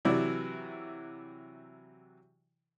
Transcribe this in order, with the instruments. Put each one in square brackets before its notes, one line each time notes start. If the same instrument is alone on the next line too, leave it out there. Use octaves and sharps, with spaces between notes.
[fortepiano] C3 E3 F#3 E4 D5